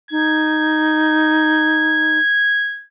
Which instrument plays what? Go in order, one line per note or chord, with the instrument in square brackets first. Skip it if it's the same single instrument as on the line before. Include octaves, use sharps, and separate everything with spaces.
[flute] D#4 [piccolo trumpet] G#6